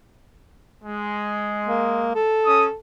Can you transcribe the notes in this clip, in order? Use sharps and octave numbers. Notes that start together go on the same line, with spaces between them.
G#3
A#3
A4
C#4 D#6